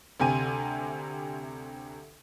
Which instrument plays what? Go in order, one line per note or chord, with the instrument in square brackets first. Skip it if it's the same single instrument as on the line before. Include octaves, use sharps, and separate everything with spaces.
[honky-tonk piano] D2 C3 G#5 D#7